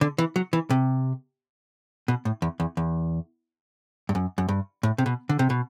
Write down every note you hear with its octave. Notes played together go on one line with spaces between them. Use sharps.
D3
E3
F#3
E3
C3
B2
A2
E2
E2
E2
G2
F#2
F#2
G2
A2
C3
B2
D3
C3
B2